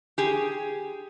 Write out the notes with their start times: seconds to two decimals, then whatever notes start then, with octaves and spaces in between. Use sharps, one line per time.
0.18 G4 G#4